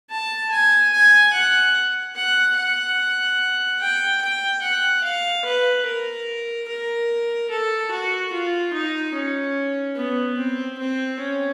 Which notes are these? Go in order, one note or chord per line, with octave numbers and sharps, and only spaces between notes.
A5
G#5
G#5
F#5
F#5
F#5
G5
G5
F#5
F5
B4
A#4
A#4
A4
F#4
F4
D#4
C#4
B3
C4
C4
C#4